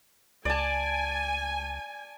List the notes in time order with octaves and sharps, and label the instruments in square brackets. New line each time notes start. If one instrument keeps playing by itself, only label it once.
[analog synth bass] C#2 [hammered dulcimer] D5 A5 [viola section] G#5